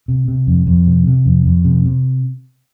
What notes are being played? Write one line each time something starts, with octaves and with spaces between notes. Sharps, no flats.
C3
C3
F2
F2
C3
C3
F2
F2
C3
C3